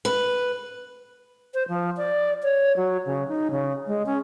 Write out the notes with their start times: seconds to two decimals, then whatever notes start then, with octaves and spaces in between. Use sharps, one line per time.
0.05 B4
1.54 C5
1.68 F3
1.97 D5
2.43 C#5
2.77 F#3
3.06 C#3
3.28 D#4
3.51 C#3
3.87 G#3
4.06 C#4